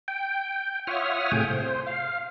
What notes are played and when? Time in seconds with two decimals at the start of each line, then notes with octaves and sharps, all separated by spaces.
0.08 G5
0.87 F4 C#5 E5 F#5 D#6 F6
1.32 A2 C3 A3 G#4 G5 G#5
1.48 C5
1.87 F5